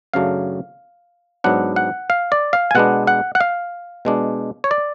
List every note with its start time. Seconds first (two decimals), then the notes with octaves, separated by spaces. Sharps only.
0.13 F#2 C#3 F#3 A3 D4 F5
1.44 G#2 F#3 B3 D4 F#5
1.76 F#5
2.10 F5
2.32 D5
2.53 F5
2.71 G#5
2.75 B2 G#3 B3 D4 F#5
3.07 F#5
3.35 F#5
3.41 F5
4.05 B2 G#3 D4
4.64 C#5
4.71 D5